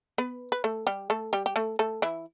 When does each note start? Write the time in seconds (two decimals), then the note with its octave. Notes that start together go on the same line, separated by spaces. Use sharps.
0.18 B3 B4
0.52 B4
0.64 A3 A4
0.87 G3 G4
1.10 A3 A4
1.33 G3 G4
1.46 G4
1.56 A3 A4
1.79 A3 A4
2.02 E3 E4